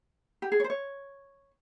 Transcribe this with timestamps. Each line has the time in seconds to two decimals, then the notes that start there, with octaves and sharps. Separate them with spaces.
0.42 G4
0.52 G#4
0.60 C#5
0.64 C5
0.70 C#5